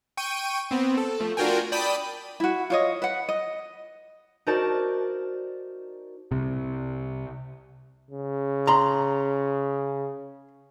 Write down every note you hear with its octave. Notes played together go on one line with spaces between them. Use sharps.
G5 C#6 D#7
B3 C4
A4
F3 A3
D4 F4 F#4 A#4 G5 G#5
D5 G5 A5 B5 D#6 B6
E4 F#4
F4 C#5 D#5
B4 F#5
D#5
D#4 F#4 A#4 C5 D5 A5
C2 C3
C#3
A#5 C6